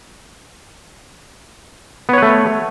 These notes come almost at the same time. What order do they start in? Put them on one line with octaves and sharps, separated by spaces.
B3 C#5 B4 A3